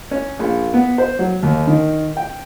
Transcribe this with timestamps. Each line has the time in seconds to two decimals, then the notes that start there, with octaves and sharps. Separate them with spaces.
0.11 C#4
0.39 A#1
0.74 B3
0.98 C5
1.19 F#3
1.43 D#2
1.67 D#3
2.17 G5